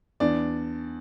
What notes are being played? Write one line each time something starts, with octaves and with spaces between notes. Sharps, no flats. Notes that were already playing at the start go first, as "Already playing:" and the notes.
E2 D4 D5